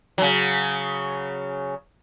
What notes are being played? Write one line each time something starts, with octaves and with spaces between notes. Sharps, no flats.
C#3 F#3